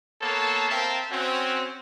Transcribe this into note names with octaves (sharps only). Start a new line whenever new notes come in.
A#3 B3 A4 C#5 F5 A5
C4 A#4 E5 F5 G5 A5
C4 C#4 F#4